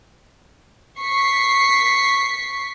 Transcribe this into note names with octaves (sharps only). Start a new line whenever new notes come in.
C#6 B6 C7